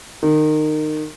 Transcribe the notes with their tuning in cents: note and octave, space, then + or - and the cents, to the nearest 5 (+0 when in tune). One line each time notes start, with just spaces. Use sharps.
D#3 -20